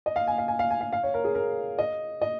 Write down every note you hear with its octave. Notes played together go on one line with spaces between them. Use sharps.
D#5
F5
G#5
F5
G#5
F5
G#5
F5
F5
C#5
A#4
G#4
A#4
D#5
D#5